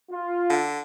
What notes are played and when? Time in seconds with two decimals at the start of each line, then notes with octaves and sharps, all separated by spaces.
0.11 F4
0.50 D3